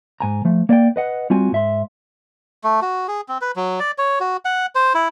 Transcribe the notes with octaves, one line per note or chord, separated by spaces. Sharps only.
G#2 G#5 A#5
F3 A3
A#3 D5 E5 G5
B4 D#5 F#5
G3 C4 F4 F#4 G#5
G#2 E5 C6
A3
F#4
G#4
C4
B4
F#3
D5
C#5
F#4
F#5
C5
E4